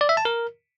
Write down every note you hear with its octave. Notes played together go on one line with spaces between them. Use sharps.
D5
E5
A5
A#4